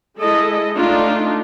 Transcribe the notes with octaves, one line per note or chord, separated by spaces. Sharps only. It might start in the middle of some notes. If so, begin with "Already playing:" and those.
G#3 E4 A4 D#5
A3 D4 D#4 F4